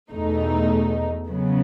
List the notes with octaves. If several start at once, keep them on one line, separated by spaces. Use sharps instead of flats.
E2 B2 A3 D#4
C#3 F#3 B3